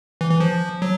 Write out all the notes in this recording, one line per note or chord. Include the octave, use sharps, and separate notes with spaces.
E3
E3
F3
F#3